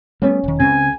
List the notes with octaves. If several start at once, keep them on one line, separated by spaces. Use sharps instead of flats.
G3 A3 B3 C#4 C#5
E1 D#3
C#2 C#3 C4 G#5